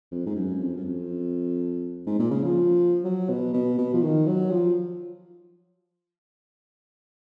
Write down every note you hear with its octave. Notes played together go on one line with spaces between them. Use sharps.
F2
G#2
F#2
F2
F#2
F2
G#2
A#2
C#3
F3
F#3
B2
B2
B2
F3
D#3
F#3
F3